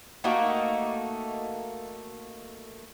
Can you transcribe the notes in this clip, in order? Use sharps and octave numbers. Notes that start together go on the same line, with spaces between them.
A3 A#3 D#4 F#4